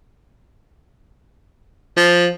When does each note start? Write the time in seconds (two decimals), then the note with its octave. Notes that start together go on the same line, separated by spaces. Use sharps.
1.97 F3